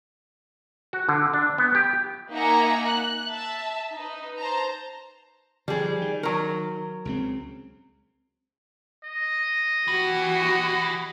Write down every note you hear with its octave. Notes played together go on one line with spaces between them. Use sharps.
F#4
D3
D4
B3
G4
A#3 D#4 E5 F#5 G#5 A#5
F#6
E5 A5
D#4 B4
C5 A5 A#5
D3 F3 G3 G#4
D#3
F#3 A#4
C#2 C#3 C4
D#5
E3 F#4 G4